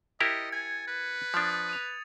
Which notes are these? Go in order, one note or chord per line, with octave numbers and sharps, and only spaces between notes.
E4 G4 A#4 D#5 A6 C#7
G#5 G#6
B4
F3 D4 D#6 A6
D#7 F7